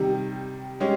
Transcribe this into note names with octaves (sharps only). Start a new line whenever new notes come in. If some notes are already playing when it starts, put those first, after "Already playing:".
Already playing: C3 D#3 G3
G#3 C#4 G4